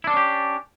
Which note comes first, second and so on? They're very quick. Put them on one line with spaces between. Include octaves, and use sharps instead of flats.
E4 D4 A4 C#4 G4